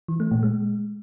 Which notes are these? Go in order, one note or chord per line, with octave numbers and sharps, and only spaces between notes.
E3
A3
A#2
G#3